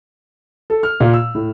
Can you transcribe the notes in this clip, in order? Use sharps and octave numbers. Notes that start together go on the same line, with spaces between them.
A4
F6
A#2
E6
A2